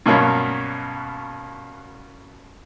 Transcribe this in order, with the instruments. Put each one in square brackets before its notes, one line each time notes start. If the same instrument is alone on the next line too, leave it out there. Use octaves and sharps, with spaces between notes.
[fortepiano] G2 B2 F#3 A#3 C#4